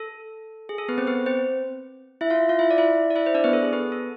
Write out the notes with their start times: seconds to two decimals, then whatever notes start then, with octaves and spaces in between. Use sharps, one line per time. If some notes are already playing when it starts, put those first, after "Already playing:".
Already playing: A4
0.69 G#4
0.78 A4
0.88 B3 B4
0.98 C4 C5
1.07 B3 B4
1.26 C4 C5
2.21 E4 E5
2.30 F4 F5
2.49 F4 F5
2.59 E4 E5
2.71 D5
2.78 E4 E5
3.10 D5
3.16 E4 E5
3.26 C5
3.34 D4 D5
3.44 B3 B4
3.53 A4
3.63 G#4
3.73 B3 B4
3.92 A4